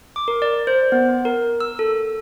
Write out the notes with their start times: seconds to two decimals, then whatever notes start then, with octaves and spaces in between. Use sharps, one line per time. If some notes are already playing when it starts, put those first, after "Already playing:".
0.16 D6
0.28 A#4
0.42 D5
0.67 C5
0.92 B3
1.25 A#4
1.61 E6
1.79 A4